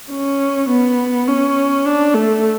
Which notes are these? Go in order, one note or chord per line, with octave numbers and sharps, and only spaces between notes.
C#4
B3
C#4
D4
A3